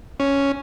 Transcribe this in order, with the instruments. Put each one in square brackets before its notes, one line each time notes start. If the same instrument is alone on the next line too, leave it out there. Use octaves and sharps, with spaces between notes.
[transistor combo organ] C#4